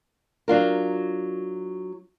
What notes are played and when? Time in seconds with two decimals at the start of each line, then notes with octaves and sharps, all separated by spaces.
0.48 F#3 D4 F4 A#4